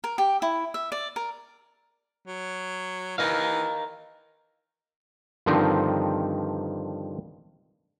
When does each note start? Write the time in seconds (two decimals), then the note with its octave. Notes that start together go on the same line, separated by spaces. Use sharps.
0.04 A#4
0.18 G4
0.42 E4
0.74 E5
0.92 D5
1.16 A#4
2.27 F#3
3.18 E3 A#4 D#5 F5
5.46 G2 D3 D#3 F3 C4 D#4